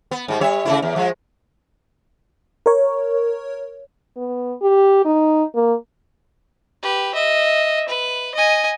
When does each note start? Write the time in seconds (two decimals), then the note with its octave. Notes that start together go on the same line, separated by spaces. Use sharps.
0.11 B3
0.28 G#2 G3
0.41 G3 C#5 E5
0.65 C#3 A3 E4
0.82 E2
0.96 F3 G#3
2.66 A#4 C#5
4.17 B3
4.62 G4
5.05 D#4
5.55 A#3
6.83 G4 B4
7.15 D#5 E5
7.89 B4
8.35 D#5 G#5